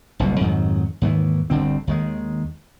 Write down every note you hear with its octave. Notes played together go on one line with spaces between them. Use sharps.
F#1 C2 F2 B2
F2 G#2 D#3 F#3
D#2 G#2 D#3 E3
G1 D2 D3 C4
D#2 D#3 G#3